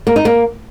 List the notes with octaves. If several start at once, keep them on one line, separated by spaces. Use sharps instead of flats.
A#3
D#4
A#3